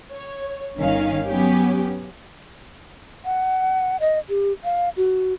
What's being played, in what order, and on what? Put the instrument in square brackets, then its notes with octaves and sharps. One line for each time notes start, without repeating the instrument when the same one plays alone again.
[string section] C#5
G1 D#3 C#4 F5
F#3 B3 C#4 G4
[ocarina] F#5
D#5
G4
F5
F#4